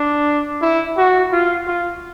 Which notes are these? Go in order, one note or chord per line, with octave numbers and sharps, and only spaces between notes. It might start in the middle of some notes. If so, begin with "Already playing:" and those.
Already playing: D4
E4
F#4
F4
F4